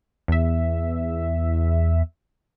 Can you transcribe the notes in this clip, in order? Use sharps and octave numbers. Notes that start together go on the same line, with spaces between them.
E2 E5